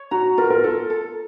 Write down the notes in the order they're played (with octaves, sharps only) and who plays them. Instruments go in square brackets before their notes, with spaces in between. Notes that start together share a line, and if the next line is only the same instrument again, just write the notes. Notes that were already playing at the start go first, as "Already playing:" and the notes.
Already playing: [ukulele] C#5
[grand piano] F#4 [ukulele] A#5
[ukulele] F4 [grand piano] A#4
[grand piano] A#4
[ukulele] F4 [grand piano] A4
[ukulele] A4